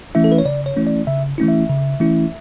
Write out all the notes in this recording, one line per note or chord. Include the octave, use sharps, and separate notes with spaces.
E3 A3 C#4 E4 E5
A4
B4
C#5
C#3 D5
C#5
E3 A3 C#4 E4
D5
C#3 E5
E3 A3 C#4 E4
E5
C#3
E3 A3 C#4 E4